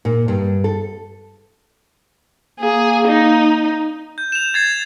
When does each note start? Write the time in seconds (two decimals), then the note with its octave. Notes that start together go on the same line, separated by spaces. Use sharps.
0.05 A#2
0.28 G2
0.64 A4
2.60 A#3 G#4
3.08 D#4
4.18 G6
4.32 E7 F7
4.54 G#6 A6 C7